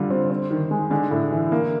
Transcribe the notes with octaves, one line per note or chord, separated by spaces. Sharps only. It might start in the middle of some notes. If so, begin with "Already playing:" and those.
Already playing: D3 G3 F4
C4
C4
D#3
G#3
D3 G#3
A2
E3
A#3